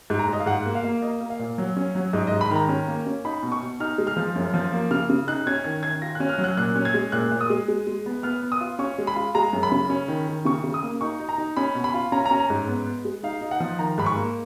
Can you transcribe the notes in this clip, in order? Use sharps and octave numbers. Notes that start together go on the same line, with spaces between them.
G#2
A#5
G#2 D#5
F5
G#2 F#5
A#3
F5
A#3
A#3 D#5
A#3
F5
A#2
F#3
C#4
F#3
G#2 D#5
G#2 D#5
B5
D#3 A#5
C#4
A#3
C#4
D#4 B5
B2
C#6
B2
D#4 F6
G#3
F6
F3
F#2
F3
A#3
C#3 F6
C#3
D#4 F#6
C#4 G#6
D#3 G#6
D#3 G#6
F4 A#6
F#6
C#4
F6
F#3
F#6
A#2 F#6
C#4
G#6
G#3
A#2 F#6
A#2
D#6
G#3
G#3
G#3
B3
B3 F6
B3
D#6
F4
C#4 C#6
G#3
B5
F4
G#3 A#5
F#2
B5
C#3
C#4
D#3
D#3
C#3 C#6
C#3
D#6
A#3
D#4 C#6
D#4
A#5
D#4
C#4 B5
B2
B5
F4
C#4 A#5
A#5
C#4
A#5
G#2
B3
B3
G#3
D#4 F5
D#4
F#5
F3
D#3 A#5
G#2 B5
C#6
A#3